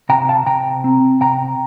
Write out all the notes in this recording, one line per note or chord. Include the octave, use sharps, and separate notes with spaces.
C3 G5 A#5
F5 A5
C3 G5 A#5
C4
C3 G5 A#5